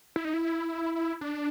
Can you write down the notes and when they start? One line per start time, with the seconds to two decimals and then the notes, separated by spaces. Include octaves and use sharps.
0.16 E4
0.25 D#4
0.34 E4
1.21 D4